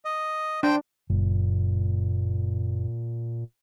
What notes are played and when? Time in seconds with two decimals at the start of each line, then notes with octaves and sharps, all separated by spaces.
0.05 D#5
0.63 D4 C5 G5
1.10 F#1 A#2